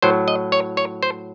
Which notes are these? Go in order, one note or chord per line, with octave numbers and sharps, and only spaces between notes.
A2 F#3 C5
D#5
C#5
C#5
C5